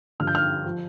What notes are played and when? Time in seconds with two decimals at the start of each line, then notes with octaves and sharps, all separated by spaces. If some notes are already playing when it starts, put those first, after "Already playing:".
0.20 G2 D3 F3 F6
0.27 G6
0.35 F6
0.66 F3